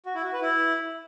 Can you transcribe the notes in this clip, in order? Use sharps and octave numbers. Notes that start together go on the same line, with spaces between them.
F#4
E4
F#4
B4
E4